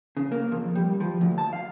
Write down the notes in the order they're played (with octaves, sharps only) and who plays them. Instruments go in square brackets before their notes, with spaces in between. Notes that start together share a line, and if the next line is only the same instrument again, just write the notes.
[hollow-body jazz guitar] C#3
A#3
F2
G3
F3
D2
A5
F5